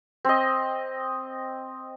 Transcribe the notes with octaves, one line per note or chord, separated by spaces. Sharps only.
C4 D#5